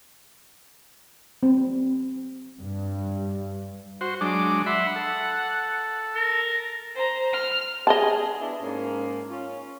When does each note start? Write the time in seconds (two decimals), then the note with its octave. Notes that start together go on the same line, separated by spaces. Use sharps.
1.43 C4
2.61 G2
4.01 F#4 C5
4.21 F#3 G#3 D4 D6
4.66 E5 F#5 B5 C6
4.96 A4
6.15 A#4
6.95 C5 A#5
7.33 F6
7.87 G#4 D#5 A5
8.39 B3 D4 E4
8.60 G#2 A#3 C#4
9.28 C#4 F4